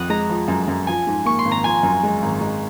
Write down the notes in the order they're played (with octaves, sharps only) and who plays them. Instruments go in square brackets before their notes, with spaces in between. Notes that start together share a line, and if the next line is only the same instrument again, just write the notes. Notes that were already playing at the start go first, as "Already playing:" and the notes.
Already playing: [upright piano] F2 [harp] F#5 D#6
[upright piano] G#3 [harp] A#5
[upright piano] F3
F#2
F#2
[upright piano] F3 [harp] G#5
[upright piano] G#2
[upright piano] A#3 [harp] C#6
[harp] C6
[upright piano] G#1
[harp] A#5
[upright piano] F3 [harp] G#5
[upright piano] F#2
G#3
G#1
G#3